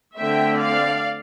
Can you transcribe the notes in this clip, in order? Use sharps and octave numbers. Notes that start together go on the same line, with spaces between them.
D3 A3 C4 E5 G5
D5 F5